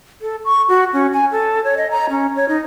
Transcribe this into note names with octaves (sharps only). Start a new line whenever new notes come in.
A4
C#6
F#4
C#4
G#5
A4
C#5
D#5
A#5
C#4
C#5
D#4